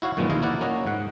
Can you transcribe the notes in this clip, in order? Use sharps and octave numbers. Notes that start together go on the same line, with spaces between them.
E4 F#4 C#5 F5
F#2 A#2 D#3 F3 G#3 B3
D#2 F3 E4 D#5 F5
A#3 E4 D5 F#5
A#3 C#4 F#4 D#5
G#2 F#5